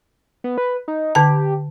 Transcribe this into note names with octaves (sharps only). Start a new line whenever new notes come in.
B3
B4
D#4
D3 G4 A5